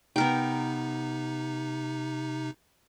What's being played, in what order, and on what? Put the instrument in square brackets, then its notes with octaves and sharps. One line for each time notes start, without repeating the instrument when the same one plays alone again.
[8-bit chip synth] C3 D#4 [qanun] B3 A#4 G5